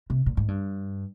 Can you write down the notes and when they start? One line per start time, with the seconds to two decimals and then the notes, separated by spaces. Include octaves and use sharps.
0.10 C3
0.26 A#2
0.37 G#2
0.48 G2